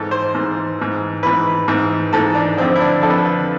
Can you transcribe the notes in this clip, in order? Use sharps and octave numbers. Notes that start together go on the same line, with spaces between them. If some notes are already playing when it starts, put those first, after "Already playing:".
Already playing: G#2 E3 A4
C5
G#2 E3
G#2 E3
G#2 E3 B4
G#2 E3
G#2 E3 A4
D4
F2 D3 C4
E4
D4
F2 D3 A4
B4
A4
B4